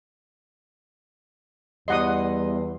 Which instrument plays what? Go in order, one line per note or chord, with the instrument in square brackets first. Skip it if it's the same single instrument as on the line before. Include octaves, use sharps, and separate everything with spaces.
[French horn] E2 [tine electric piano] G3 C6 C7 [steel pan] D#5 F#5 D#6